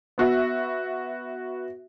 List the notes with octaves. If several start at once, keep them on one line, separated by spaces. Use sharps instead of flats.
B3 F#4 E5